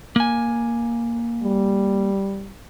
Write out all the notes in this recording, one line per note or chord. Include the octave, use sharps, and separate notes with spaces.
A#3 G#5
G3